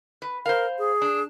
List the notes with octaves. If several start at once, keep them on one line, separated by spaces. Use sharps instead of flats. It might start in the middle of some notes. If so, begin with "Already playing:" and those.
B4
A#4 C5 F5
G#4
D4